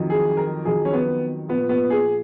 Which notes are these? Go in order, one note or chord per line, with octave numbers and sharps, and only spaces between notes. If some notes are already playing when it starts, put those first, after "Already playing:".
Already playing: F2 D#3 F#3
G#4
A#4
F2 D#3 F#3 G#4
C#4
B3
A#2 F3 B3
B3
G#4